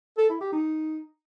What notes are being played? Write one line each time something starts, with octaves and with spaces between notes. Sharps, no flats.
A4
E4
G4
D#4